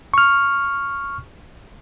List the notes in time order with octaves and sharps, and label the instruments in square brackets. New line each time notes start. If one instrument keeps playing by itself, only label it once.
[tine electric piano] C#6 F6